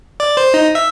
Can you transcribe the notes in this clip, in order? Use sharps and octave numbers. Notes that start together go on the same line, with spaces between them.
D5
C5
D#4
E5